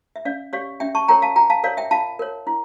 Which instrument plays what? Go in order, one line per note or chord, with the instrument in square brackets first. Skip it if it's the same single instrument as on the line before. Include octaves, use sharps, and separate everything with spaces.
[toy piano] E5
C#4 D5 F5
G4 C#5 D5 F5
C#4 E5 G5
A5 C#6
F4 A#4 C#5 G5 A#5
F5 A5
F4 G5 A#5
F5 A5
A#4 C#5 D5 F5
E5 G5
F4 F5 A5
A#4 C#5
E4